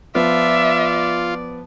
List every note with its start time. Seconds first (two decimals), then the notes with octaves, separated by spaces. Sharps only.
0.15 F3 B3 F4 D5 E5